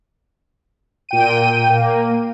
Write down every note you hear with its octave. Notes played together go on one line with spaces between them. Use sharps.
A#2 G5 D#7
A#3